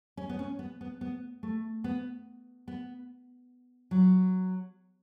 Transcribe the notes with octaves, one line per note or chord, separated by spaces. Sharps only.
C#4
B3
C#4
B3
B3
B3
A3
B3
B3
F#3